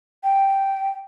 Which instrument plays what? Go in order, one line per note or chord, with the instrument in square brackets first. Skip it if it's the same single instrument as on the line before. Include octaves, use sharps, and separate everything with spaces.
[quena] G5